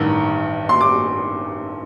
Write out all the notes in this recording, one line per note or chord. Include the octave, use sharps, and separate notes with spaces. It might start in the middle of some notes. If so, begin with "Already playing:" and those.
Already playing: A1 G2 D#3 A#5
C6
D6